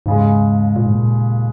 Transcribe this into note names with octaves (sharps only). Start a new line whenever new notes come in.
D#2 G#2 C#3 G#3
A#2
G#2
A#2